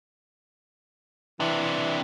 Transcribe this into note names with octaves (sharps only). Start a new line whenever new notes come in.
C3 E3 D4